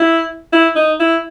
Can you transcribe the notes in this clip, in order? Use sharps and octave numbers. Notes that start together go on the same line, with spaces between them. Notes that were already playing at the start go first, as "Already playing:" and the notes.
Already playing: E4
E4
D#4
E4